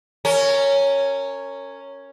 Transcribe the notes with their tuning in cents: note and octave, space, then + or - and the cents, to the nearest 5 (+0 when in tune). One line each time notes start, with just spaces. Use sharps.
C#4 +0 A#4 -25